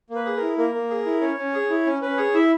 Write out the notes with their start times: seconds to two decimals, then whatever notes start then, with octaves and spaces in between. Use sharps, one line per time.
0.10 A#3
0.15 B4
0.25 G#4
0.36 E4 A#4
0.58 A#3 A#4
0.74 A#3
0.90 G#4
1.06 E4
1.21 C#4 C#5
1.37 C#4
1.54 G#4
1.70 E4
1.86 C#4
2.02 C#4 B4
2.17 G#4 C#5
2.34 E4 E5